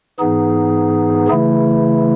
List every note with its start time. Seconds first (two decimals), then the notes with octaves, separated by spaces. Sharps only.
0.19 G#2 E3 B3 D#4 G#4
1.28 C#3 E3 A3 E4